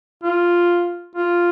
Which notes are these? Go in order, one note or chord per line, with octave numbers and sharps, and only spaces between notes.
F4
F4